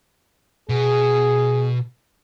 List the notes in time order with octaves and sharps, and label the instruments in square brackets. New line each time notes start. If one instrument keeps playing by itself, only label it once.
[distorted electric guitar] B2 [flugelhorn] G#4